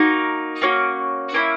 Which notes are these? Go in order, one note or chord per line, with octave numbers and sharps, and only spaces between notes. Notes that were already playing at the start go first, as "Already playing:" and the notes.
Already playing: A#3 D#4 F#4 A#4
A#3 C#4 F#4
A#3 C#4 E4